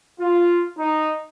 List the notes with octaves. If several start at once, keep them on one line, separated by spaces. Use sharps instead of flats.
F4
D#4